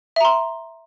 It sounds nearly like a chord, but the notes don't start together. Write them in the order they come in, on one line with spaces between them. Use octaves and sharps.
E5 A#5 C6